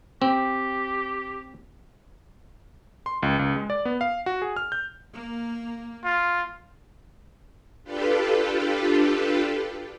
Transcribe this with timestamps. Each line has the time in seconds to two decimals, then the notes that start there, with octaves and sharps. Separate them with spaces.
0.22 C4 G4
3.06 C6
3.23 C#2
3.39 C#2
3.56 G#3
3.70 D5
3.85 B3
4.01 F5
4.26 F#4
4.42 G#4
4.56 F6
4.72 G6
5.12 A#3
6.05 F4
7.84 D4 F4 G4 A4 B4